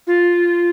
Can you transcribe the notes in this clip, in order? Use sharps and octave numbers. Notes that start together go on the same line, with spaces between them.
F4